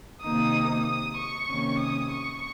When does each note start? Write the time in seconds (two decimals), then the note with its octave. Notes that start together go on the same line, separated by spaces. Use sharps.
0.23 C3 D#3 A#3 D#4 D#6
0.85 D#6
1.17 C#6
1.48 C3 D#3 A#3 C#4
1.80 D#6
2.11 C#6